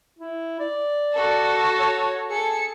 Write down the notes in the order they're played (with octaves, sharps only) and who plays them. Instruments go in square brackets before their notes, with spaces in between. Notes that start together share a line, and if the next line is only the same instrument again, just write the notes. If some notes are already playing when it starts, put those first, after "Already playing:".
[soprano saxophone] E4
D5
[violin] F#4 A4
[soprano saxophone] C#5
[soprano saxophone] G#4 [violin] A4 C#7